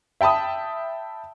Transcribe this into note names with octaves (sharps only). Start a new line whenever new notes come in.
E5 G5 A5 B5 D#6